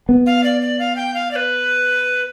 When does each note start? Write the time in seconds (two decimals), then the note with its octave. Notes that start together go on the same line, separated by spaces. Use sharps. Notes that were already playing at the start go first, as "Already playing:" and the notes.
0.09 B3
0.26 F5
0.44 D5
0.61 D5
0.79 F5
0.96 G5
1.14 F5
1.31 D5
1.36 B4